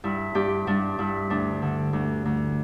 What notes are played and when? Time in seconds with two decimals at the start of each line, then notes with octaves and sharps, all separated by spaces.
0.04 G2 E4
0.35 G2 G4
0.67 G2 D4
0.99 G2 E4
1.30 D2 D4
1.62 D3
1.93 D2
2.25 D2